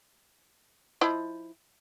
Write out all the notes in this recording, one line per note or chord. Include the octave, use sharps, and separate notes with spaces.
F3 E4 D#5